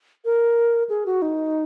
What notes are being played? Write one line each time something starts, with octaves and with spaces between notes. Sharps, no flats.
A#4
G#4
F#4
D#4